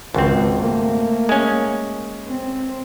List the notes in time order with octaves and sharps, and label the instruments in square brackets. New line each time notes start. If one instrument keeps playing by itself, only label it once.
[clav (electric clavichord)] G#1 C4 [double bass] C#2
[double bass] A3 A#3
[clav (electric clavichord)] G#3 C#4
[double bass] C4